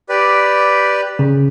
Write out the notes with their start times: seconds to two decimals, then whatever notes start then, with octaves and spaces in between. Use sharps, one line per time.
0.09 G4 B4 D5
1.19 C#3